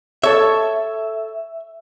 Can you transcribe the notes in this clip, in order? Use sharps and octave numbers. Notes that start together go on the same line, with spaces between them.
A4 C#5 E5